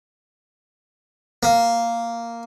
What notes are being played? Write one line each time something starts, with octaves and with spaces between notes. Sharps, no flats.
A#3